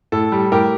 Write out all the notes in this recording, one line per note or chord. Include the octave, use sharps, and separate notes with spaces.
A2 A4
G3
A2 G4 A#4